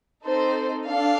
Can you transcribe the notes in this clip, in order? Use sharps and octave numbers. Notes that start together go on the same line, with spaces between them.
C4 D#4 A4 C5
D4 A4 F5